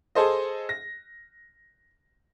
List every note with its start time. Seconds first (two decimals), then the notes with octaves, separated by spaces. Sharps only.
0.15 G#4 A4 C5 D#5
0.69 A#6